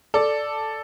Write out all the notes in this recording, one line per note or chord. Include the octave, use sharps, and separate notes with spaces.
A4 D5